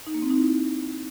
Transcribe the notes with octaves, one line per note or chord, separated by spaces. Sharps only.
D#4
A#3
C4
D#4
E4